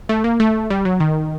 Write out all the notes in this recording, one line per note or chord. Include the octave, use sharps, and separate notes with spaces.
A3
A#3
A3
G3
F#3
D#3